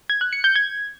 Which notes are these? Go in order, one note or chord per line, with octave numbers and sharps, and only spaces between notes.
G#6
F#6
C#7
G6
G#6